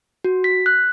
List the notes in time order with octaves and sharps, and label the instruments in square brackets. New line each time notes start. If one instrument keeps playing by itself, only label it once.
[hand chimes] F#4
B6
F#6